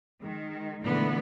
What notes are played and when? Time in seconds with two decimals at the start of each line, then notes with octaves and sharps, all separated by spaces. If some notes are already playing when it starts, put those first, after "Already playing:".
0.21 D#3 G#3
0.81 A#2 D3 E3 G#3 A3 B3